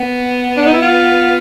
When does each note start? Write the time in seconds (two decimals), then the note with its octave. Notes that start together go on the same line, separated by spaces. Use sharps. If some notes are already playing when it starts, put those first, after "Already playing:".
Already playing: B3
0.57 D4
0.66 D#4
0.73 E4
0.82 F4